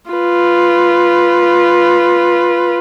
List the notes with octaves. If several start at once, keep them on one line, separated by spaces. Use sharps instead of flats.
F4 B4